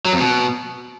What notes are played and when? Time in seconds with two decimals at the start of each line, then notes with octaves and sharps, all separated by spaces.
0.05 F#3
0.13 F2
0.20 B2